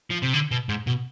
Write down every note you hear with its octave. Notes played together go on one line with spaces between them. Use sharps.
F3
C3
D3
B2
G#2
B2